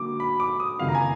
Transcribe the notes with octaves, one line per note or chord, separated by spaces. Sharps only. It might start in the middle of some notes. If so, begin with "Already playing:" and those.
Already playing: D3 F#3 A#3 D4 D6
B5
D6
D#6
F#1 F2 D#3 F5
A#5
G#5